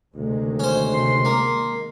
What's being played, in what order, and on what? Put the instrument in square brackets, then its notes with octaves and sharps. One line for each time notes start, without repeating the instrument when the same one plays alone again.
[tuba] D2 [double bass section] C3 D#3 G#3
[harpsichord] C#4 C5
[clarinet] C6
[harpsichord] A#3